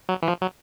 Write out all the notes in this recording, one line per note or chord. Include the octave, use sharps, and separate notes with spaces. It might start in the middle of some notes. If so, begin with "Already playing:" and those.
F#3
E3
F3
F#3